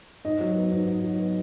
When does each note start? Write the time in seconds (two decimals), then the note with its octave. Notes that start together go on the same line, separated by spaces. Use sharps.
0.25 G#2 D#5
0.40 F#3
0.56 B3
0.72 G#2
0.87 G#2
1.04 F#3
1.19 B3